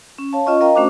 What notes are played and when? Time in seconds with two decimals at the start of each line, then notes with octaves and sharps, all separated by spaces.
0.18 C#4
0.33 C#5 F5 A5
0.46 C#4 F4 D#5 C#6
0.61 A#4 D#5 F5 G5 A#5
0.75 A3 C#4 D4 F#4 C5 D6